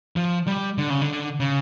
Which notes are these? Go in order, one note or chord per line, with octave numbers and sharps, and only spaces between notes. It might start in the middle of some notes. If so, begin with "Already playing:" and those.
F3
G3
D3
C#3
D3
C#3